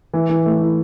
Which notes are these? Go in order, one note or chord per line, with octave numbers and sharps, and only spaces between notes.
E3
E3
A3
E4